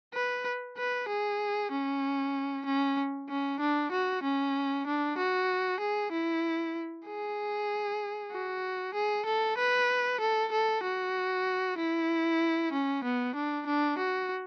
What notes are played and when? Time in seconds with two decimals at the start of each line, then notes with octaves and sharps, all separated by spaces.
0.14 B4
0.77 B4
1.08 G#4
1.71 C#4
2.65 C#4
3.29 C#4
3.60 D4
3.91 F#4
4.23 C#4
4.86 D4
5.17 F#4
5.80 G#4
6.11 E4
7.06 G#4
8.32 F#4
8.94 G#4
9.26 A4
9.58 B4
10.20 A4
10.52 A4
10.83 F#4
11.78 E4
12.73 C#4
13.04 B3
13.35 D4
13.67 D4
13.98 F#4